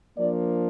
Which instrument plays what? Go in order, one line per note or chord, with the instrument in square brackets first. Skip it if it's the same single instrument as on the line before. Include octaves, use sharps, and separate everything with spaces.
[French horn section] F3 A#3 D4 D5